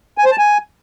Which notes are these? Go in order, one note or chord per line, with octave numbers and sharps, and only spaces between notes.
G#5
C5
A5
G#5